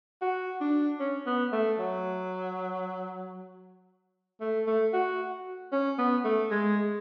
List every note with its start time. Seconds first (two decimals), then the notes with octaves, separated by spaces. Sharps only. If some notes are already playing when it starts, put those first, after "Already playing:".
0.21 F#4
0.61 D4
1.00 C#4
1.26 B3
1.52 A3
1.79 F#3
4.41 A3
4.67 A3
4.93 F#4
5.72 C#4
5.98 B3
6.24 A3
6.51 G#3